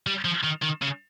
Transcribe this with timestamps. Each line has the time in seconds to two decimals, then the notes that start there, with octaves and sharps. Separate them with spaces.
0.07 G3
0.25 F3
0.44 D#3
0.63 D#3
0.82 C#3